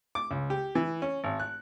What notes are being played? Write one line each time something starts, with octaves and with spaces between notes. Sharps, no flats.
D6
C#2
G4
E3
C#4
G#1
F#6